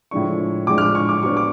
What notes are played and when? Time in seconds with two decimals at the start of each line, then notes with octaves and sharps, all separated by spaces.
0.11 A2 F3 G#3 D4 C#6
0.67 A2 F3 G#3 D4 D6
0.78 F6
0.81 D6
0.95 C#6
1.09 D6
1.23 F#3 B3 D4 C#6
1.37 D6